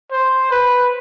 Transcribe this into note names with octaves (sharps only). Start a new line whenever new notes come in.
C5
B4